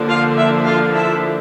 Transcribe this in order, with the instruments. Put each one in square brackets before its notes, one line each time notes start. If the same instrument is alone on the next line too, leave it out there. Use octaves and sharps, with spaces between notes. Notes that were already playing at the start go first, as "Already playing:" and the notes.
Already playing: [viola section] D3 F3 A#3 D4
F4 F5
E4 E5
F4 F5
E4 E5